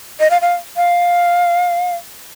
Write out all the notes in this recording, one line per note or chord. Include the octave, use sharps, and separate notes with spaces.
D#5
F5
F5
F5